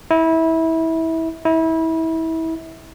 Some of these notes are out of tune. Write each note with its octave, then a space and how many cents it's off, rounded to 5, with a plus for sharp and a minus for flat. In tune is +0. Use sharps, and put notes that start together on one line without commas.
E4 -25
E4 -30